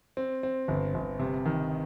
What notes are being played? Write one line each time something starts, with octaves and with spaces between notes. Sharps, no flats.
C4
C4
G1
G1
C3
D#3